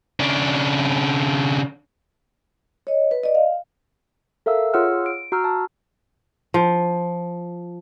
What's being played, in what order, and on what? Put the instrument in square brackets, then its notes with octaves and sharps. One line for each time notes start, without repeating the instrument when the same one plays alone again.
[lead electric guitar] C#3 D4
[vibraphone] C#5 D#5
B4
D5 D#5
F5
[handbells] A4 A#4 E5 F5 E6
F4 G#4 C#5 F#5 E6 F6
D7
F#4 A#5 E6 F6
A5
[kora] F3